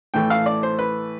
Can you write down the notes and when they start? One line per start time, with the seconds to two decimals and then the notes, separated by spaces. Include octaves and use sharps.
0.14 A2 E3 A3 G5
0.30 F5
0.46 D5
0.63 C5
0.79 B4